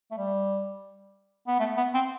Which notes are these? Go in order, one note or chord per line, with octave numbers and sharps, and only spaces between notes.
A3
G3
B3
A3
B3
C4